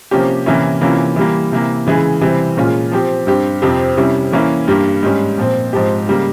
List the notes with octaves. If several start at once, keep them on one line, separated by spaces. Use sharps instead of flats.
C3 F3 A#3 C#4 G4
C3 E3 A#3 C#4 E4
C3 E3 A#3 C#4 F4
E3 G3 A#3
C3 E3 A#3
C#3 E3 G#3 E4 G#4
C3 E3 G3 C4
A#2 G#3 C#4 F4 G#4
F3 C4 G4
G2 G3 C4 G4
F2 C3 F3 C4 G4
C3 G3 C#4 E4
E3 A#3 C#4 E4
G2 G3 A#3
G#2 G3 C#4
A#2 F3 C4
G#2 F3 C4 G4
C#3 G3 A#3